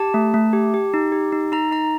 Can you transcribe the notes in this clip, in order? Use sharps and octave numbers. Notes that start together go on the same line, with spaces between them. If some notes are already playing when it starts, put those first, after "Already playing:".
Already playing: G4 A5
A3
A3
G4
G4
D#4
G4
D#4
D#4 A#5
D#4 A#5